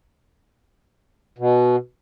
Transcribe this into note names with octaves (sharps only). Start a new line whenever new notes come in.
B2